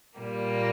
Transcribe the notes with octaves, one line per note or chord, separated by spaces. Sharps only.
A#2 G3 A#3